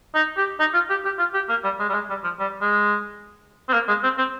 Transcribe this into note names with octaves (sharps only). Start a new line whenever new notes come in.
D#4
G4
D#4
F4
G4
G4
F4
G4
A#3
G3
G#3
G3
G#3
G3
F3
G3
G#3
C4
A#3
G#3
C4
C4